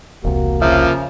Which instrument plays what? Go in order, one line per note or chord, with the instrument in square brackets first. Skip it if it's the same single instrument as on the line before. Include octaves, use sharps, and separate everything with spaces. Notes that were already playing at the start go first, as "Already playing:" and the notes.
[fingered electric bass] E1 C2 [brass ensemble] A#3 F#4
[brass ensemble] C#3 [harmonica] F3 A#3 [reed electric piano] E5